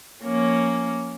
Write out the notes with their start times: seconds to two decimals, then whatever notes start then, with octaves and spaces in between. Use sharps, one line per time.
0.22 F3 A#3 C#4 C#5